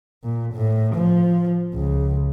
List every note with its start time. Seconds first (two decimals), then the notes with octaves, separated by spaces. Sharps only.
0.24 A#2
0.54 A2
0.95 F3
1.74 C#2